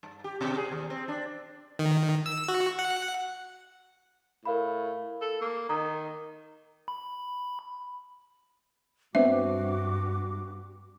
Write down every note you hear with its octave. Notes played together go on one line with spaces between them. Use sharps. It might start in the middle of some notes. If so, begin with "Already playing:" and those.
G2
G4
B2
G#4
D#2
C4
D4
D#3
E6
F#4
F#5
A2 A#4 F5 B5
A4
A#3
D#3 A#5 D#6
B5
G2 B3 C4 D4 F#4 E5 D6